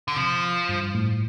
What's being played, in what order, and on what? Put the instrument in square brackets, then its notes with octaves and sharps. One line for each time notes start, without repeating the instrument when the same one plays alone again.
[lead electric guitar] D3
[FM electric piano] C3 [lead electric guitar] F3
[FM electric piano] G2
A2